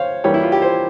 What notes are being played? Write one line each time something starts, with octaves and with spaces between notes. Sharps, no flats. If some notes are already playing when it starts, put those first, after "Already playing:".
Already playing: C5 C#5 F5
E3 G3 A#3 C#5
E4
F4
G4
C5